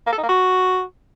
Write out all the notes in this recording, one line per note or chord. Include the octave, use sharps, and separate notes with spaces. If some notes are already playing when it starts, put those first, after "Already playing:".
A#3
A4
D#4
A#3
F#4